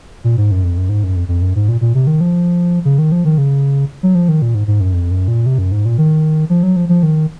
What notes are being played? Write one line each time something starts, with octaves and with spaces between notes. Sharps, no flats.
A#2
G#2
F#2
F2
F#2
G#2
F#2
F2
F2
F#2
G#2
A#2
A#2
C3
D#3
F3
C#3
D#3
F3
D#3
C#3
F#3
F3
D#3
A#2
G#2
G#2
F#2
F2
F#2
A#2
C3
F#2
G#2
A#2
D#3
F3
F#3
F3
F3
D#3